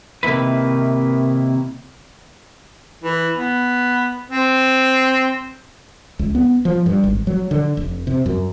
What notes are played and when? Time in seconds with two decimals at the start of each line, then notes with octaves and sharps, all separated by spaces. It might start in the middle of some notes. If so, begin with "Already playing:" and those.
0.23 C3 D#3 A#3 E4 B4
3.04 E3
3.37 B3
4.30 C4
6.19 C#2
6.35 B3
6.65 F3
6.86 G2
7.04 G#1
7.27 F#3
7.51 D3
7.77 F1
8.07 C3
8.26 F#2